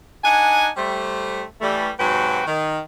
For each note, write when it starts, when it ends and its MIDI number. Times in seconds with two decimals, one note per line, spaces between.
0.24 0.68 62
0.24 0.68 63
0.24 0.68 78
0.24 0.68 80
0.77 1.42 55
0.77 1.42 57
0.77 1.42 72
1.61 1.90 52
1.61 1.90 55
1.61 1.90 57
2.00 2.41 44
2.00 2.41 48
2.00 2.41 54
2.00 2.41 66
2.00 2.41 71
2.00 2.41 79
2.47 2.79 51